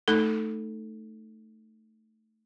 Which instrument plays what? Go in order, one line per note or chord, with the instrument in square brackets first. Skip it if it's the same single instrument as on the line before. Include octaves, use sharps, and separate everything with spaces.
[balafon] A3 D#4 A4